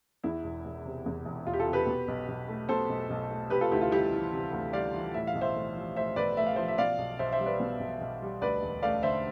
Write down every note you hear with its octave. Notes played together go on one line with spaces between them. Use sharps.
E2 E4
E1
E1
C3
E2
E1
E1 F4
G4
F4 A4
C3
G4 B4
B2
B1
B1
A3
B2 A4 C5
B1
B1
A3
C3 G4 B4
F4 A4
D2 E4 G4
F4
G3 E4 G4
E3
C3
D2
G3 D5 F5
E3
A2 E5
F5
B1
C5 E5
A3
F3
A2 C5 E5
B1 B4 D5
A3 E5
F5
F3 C5 E5
E5
B2 D5 F5
B1
B1 C5 E5
C5 E5
G3
B4 D5
B2
B1
B1
G3
D2 B4 D5
E1
A3 D5 F5
D3 C5 E5